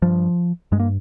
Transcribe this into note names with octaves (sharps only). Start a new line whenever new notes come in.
G2 F3
G2 G#3
A#3